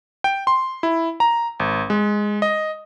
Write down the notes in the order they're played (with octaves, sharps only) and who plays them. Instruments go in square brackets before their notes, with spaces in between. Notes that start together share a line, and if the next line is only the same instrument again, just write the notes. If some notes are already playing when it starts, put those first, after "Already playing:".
[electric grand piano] G5
C6
E4
A#5
G#1
G#3
D#5